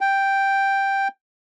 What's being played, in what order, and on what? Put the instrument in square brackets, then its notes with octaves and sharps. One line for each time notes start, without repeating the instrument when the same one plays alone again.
[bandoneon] G5